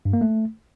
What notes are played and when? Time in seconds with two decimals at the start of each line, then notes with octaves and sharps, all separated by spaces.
0.05 G2
0.13 A#3
0.21 A3